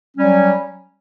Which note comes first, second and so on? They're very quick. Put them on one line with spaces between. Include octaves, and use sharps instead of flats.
C#4 G3 F#3